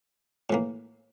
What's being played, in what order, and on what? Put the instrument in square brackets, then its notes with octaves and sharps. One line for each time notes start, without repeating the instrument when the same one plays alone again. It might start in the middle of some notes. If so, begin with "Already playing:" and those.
[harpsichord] A2 E3 A#3